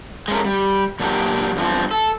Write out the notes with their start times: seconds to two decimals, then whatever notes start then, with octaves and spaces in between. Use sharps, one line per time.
0.28 G#3 A3 C#4 A#4
0.45 G3
1.00 A#2 F#3 D4 D#4 F#4 G4
1.56 E2 G2 D#3 F3 C4
1.91 A4